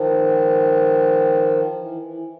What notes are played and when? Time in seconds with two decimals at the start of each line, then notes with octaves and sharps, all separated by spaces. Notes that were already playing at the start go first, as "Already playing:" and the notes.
Already playing: D#3 F3
1.79 E3
2.02 E3